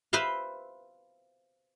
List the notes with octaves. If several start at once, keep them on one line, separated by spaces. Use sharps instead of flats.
B4 C5 E5 F5 C6